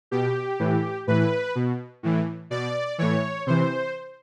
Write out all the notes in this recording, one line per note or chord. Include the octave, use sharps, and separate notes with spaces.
B2 G4
A2 E3
A2 E3 B4
B2
A2 E3
B2 D5
A2 E3 C#5
C3 E3 C5